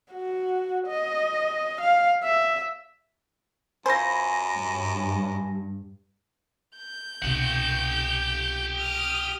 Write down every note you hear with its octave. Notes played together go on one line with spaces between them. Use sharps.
F#4
D#5
F5
E5
F#2 F4 C5 G#5 B5 A#6
G2
G6
C2 B2 G4 F#5
D#6 F6